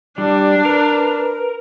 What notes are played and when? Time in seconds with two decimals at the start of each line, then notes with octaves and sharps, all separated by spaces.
0.18 G3 D4
0.65 A#4 B4